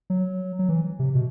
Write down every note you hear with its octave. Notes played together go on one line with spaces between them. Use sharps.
F#3
F#3
E3
C3
B2